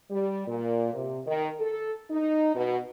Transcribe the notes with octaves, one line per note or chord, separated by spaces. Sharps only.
G3
A#2
C3
D#3
A4
D#4
B2